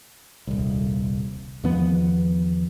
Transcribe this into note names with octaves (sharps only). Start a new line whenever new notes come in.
D#1 C2
E2 D#3 F3 B3